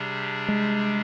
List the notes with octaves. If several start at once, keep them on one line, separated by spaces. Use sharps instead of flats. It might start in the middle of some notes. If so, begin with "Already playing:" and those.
Already playing: C3 G3 D4 G#4
G#3